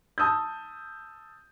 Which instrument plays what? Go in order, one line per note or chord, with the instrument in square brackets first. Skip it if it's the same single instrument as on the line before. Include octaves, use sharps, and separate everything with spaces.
[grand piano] A5 D#6 E6 G6